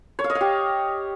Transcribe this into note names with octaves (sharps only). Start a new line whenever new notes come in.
C#5
F5
D#5
F5
G4